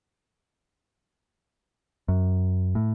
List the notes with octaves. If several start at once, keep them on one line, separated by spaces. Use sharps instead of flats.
F#2
A2